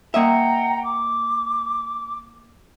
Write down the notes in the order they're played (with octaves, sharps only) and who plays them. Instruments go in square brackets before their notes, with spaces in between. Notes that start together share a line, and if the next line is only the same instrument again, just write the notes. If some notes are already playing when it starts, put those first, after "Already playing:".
[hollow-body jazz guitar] A#3 D#5 E5 [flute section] F#5 G5 A#5
[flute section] D6